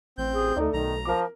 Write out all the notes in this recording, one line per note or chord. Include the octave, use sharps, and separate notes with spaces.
A1 C4 G6
G#4
D2 A3 D#4 D5
B1 D#3 A#5
F3 A#4 D6